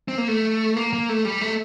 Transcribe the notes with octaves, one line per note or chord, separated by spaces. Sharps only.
C4
A#3
A3
A#3
A#3
A3
G3
A3